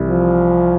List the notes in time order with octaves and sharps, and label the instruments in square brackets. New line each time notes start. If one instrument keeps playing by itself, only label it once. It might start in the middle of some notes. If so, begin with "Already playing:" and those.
Already playing: [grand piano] C2 C3 E3
[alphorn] F3